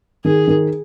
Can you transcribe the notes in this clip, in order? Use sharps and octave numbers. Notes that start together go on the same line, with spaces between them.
D#3 G#4
D#3